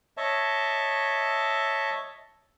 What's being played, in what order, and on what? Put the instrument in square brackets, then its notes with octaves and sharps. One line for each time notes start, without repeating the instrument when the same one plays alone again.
[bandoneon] C#5 D#5 E5 A5